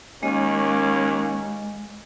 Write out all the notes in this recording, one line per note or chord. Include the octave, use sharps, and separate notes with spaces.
D#2 G#3 A#3 C#4 D#5